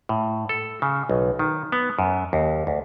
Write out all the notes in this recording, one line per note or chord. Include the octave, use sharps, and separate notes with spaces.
A2
A4
C#3
B1
D#3
B3
F#2
D#2
D2